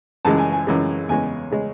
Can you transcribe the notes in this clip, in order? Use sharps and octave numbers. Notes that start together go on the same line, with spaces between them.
F#2 C#3 E3 G#3 A5
G#5
G#5
F#2 C#3 E3 G#3
E2 C#3 G#3 G#5
C#3 G#3